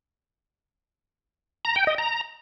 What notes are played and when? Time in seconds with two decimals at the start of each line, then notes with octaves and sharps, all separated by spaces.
1.65 A#5
1.76 G5
1.87 D#5
1.98 A#5